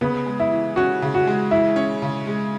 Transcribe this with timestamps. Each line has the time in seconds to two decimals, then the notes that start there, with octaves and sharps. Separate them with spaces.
0.01 C#3 B3
0.26 G#3
0.40 E4
0.52 E3
0.76 C#4 F#4
1.02 C#3
1.14 F#4
1.27 G#3
1.51 E3 E4
1.76 C#4
2.02 C#3
2.27 G#3